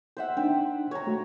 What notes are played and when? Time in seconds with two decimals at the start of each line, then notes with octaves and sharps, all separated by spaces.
0.17 C5 E5 F#5
0.37 C4 D4 D#4
0.91 C#5 A#5
1.07 A3 F#4